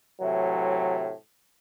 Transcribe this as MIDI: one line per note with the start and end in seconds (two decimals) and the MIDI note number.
0.21 1.10 45
0.21 1.10 48
0.21 1.10 52
0.21 1.10 54